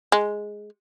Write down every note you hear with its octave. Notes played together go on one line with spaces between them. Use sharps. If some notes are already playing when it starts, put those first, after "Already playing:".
G#3